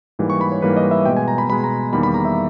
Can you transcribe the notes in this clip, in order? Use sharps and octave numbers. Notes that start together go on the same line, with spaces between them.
G#2 E3 G3 A#3
C#6
B5
C#5
G#2 E3 G3 A#3 B4
D#5
E5
B2 G#3 G5
G#5
A#5
B5
B2 G#3 B5
A#5
E2 D#3 G3 A#3 B5
B5
A#5
E5